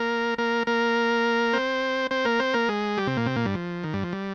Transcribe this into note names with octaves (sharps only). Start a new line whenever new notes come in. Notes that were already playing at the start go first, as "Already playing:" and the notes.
Already playing: A#3 A#4
A#3 A#4
A#3 A#4
C4 C5
C4 C5
A#3 A#4
C4 C5
A#3 A#4
G#3 G#4
G3 G4
C3 C4
A#2 A#3
C3 C4
A#2 A#3
G2 G3
F3
D#3
G2 G3
F3
G3